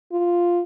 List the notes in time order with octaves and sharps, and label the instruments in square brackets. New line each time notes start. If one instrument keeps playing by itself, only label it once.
[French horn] F4